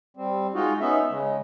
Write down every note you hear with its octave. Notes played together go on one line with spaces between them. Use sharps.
G3 C4
G#3 D#4 F4 F#4
B3 C#4 D#4 E5
C#3 G#3